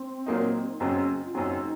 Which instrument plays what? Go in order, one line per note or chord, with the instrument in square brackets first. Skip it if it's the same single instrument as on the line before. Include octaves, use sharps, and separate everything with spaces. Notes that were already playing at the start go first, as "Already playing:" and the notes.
Already playing: [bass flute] C4
[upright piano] A#2 F#3 A#3 D#4
[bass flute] D#4
[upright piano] F#1 F#2 C#3 F#3 C4 [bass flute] C#4
[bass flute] F4
[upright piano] F#1 F#2 C#3 F#3 C4 [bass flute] D#4